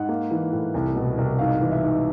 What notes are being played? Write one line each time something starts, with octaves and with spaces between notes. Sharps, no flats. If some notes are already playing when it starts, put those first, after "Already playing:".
Already playing: G#2 F#5
A#3
E3
A2
C2
B2
C2
G#2 F5
E3
E5
G#2